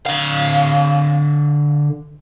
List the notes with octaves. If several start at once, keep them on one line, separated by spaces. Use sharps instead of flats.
D3 F5